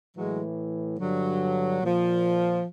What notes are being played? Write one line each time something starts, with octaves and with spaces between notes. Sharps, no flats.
A2 E3 F#3 G#3
G2 D3 F#3
A#2 F3